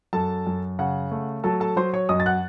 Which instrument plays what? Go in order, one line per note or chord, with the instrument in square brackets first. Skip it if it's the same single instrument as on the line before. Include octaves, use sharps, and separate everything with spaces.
[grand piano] F#2 A4 A5
F#2
C#3 F#5
A3
F#3 A4 A5
A4 A5
F#3 C5 C6
C#5 C#6
F#2 D#5 D#6
A6
F#5 F#6